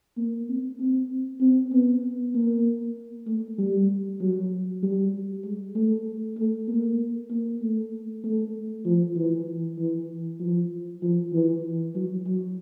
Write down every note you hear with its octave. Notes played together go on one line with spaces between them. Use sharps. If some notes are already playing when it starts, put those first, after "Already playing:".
A#3
C4
C4
C4
B3
A#3
A3
G3
F#3
G3
G#3
A3
A3
A#3
A#3
A3
A3
F3
E3
E3
F3
F3
E3
F#3
F#3